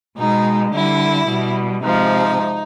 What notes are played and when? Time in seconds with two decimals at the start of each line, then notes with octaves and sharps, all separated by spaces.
0.19 B2 G#3 D#4
0.73 D3 G3 E4
1.29 B2 G3
1.83 C3 F3 G#3 D#4